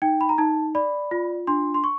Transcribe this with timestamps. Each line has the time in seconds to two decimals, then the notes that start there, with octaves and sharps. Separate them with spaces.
0.02 D#4 G5
0.21 B5
0.29 A#5
0.38 D#4 A5
0.75 D5 B5
1.11 F4
1.47 D4 C6
1.74 C6
1.84 C#6